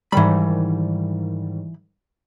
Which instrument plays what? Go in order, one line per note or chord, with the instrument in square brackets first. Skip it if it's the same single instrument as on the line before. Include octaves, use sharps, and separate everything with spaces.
[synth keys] G#2 D#3 G3 [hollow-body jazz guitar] E3 B5